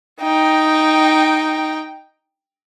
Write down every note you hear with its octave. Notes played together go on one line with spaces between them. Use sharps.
D#4 G5